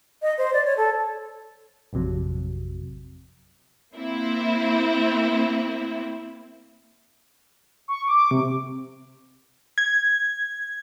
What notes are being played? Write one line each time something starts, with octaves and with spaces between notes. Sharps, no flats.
D#5
C5
D5
C#5
A4
A1 F2 C3 F#3
A#3 C4 E4
C#6
D6
C3
G#6